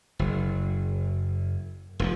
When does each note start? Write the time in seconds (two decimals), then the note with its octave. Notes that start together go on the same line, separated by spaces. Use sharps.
0.19 F#1
1.99 F1 A2 F3